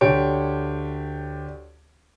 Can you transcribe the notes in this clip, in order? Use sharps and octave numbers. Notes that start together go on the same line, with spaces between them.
D2 D4 G4 C#5 D7